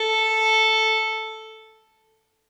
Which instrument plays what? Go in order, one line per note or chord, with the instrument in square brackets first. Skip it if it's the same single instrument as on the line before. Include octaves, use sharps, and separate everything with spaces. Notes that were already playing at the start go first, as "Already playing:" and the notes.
Already playing: [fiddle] A4